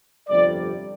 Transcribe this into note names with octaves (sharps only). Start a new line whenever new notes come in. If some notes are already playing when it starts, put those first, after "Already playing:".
G1 F2 C3 G3 D5